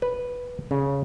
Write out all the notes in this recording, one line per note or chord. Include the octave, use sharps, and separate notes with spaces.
B4
C#3